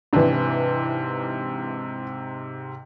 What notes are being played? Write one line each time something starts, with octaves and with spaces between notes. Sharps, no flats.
G#2 C3 E3 D4